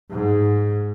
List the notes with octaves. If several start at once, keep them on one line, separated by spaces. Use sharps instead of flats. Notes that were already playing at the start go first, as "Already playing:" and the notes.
G#2